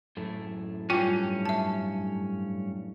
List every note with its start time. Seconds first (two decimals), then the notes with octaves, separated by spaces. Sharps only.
0.17 F#2 A2 A3
0.90 G2 C#4 F4 G5
1.46 E5 A5